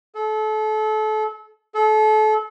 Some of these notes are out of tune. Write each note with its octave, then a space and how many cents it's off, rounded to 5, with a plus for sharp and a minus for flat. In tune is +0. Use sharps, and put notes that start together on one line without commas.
A4 -30
A4 -30